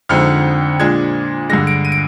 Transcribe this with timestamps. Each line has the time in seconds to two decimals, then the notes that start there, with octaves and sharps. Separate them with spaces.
0.09 F2 D3 G#3 C4 D#4 F6
0.79 A#2 G#3 D4 G#6
1.49 G2 D3 G#3 A#6
1.67 D7
1.85 D#7
1.92 D7